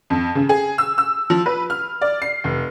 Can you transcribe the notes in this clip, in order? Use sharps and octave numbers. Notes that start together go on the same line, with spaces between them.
F2
C#3
G#4
E6
E6
F3
B4
F6
D5
C7
F1